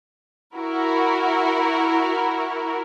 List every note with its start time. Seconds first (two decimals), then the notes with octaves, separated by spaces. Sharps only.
0.55 E4 F#4 A#4